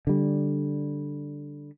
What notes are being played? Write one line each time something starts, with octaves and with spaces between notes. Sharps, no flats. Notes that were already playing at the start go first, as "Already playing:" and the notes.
D3 G3